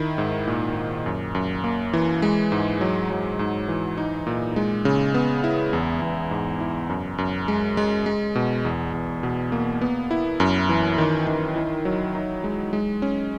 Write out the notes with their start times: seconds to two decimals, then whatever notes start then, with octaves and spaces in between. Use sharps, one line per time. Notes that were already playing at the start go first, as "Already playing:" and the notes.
Already playing: D#3 E4
0.18 G#2
0.47 A#2
0.76 A#2
1.06 F#2
1.35 F#2
1.64 A#3
1.93 E3
2.22 G#3
2.52 G#2
2.81 F#3
3.10 F#3
3.39 G#2
3.68 E3
3.97 D#4
4.27 A#2
4.56 G#3
4.85 C#3
5.14 B3
5.44 E4
5.73 E2
6.02 E2
6.31 G#2
6.60 E4
6.90 F#2
7.18 F#2
7.48 G#3
7.77 G#3
8.06 G#3
8.35 B2
8.65 E2
8.93 E2
9.23 B2
9.52 A#3
9.81 B3
10.11 E4
10.40 F#2
10.69 E3
10.98 D#3
11.27 D#3
11.56 E4
11.85 F#3
12.15 D#4
12.44 G#3
12.73 G#3
13.02 C#4